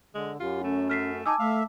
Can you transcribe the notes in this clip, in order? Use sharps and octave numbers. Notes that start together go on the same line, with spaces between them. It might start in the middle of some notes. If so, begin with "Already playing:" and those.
D3 G#3
F#2 F4 G4
A3 C#4
A3 F6 B6 C7
D#4 G#5 A5 D6 E6
A3 E5 F5